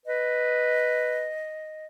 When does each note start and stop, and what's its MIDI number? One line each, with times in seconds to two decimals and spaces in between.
0.06 1.30 71
0.06 1.86 75